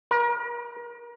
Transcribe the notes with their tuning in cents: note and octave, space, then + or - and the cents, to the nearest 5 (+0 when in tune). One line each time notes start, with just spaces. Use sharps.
A#4 +35